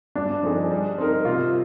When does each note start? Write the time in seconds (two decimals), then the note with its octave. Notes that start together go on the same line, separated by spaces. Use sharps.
0.15 G2 D4
0.43 F3 C4 D#4 G#4
0.71 G3
0.98 C4 D#4 A#4
1.25 C3 F4